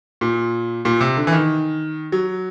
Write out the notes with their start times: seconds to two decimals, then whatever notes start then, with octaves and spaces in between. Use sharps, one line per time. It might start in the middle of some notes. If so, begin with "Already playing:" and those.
0.21 A#2
0.85 A#2
1.01 C3
1.17 D3
1.27 E3
1.32 D#3
2.12 F#3